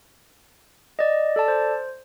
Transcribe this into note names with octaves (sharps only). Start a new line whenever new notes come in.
D5 D#5
A4 D5 A5
C5